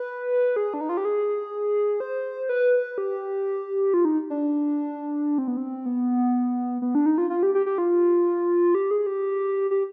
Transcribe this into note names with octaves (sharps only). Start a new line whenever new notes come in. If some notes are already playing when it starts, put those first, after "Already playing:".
Already playing: B4
G#4
D4
D#4
F4
G4
G#4
C5
B4
G4
F4
D#4
D4
C4
B3
C4
B3
B3
D4
D#4
F4
F4
G4
G4
G4
F4
G4
G#4
G4
G4